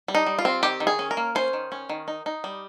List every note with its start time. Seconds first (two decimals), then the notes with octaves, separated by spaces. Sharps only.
0.08 G3
0.15 D#4
0.27 G3
0.39 F4
0.45 C4
0.63 D#3 G4
0.80 D#3
0.87 G#4
0.99 C#4
1.11 A#4
1.17 A#3
1.35 C#4 C5
1.53 D#3
1.72 C#4
1.89 D#3
2.08 D#4
2.26 D#4
2.44 G3